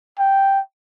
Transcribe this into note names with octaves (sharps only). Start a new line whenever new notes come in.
G5